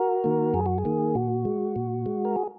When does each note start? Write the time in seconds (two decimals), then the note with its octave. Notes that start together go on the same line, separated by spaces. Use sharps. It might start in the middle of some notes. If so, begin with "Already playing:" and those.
Already playing: F#4 A#4
0.24 D#3 A#3
0.54 F#2 G#4
0.66 F#4
0.78 G#4
0.85 D#3 A#3
1.15 A#2 F#4
1.45 G#3
1.76 A#2
2.06 G#3
2.25 A#4
2.36 G#4